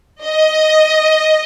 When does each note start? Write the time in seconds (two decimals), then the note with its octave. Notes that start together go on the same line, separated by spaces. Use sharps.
0.23 D#5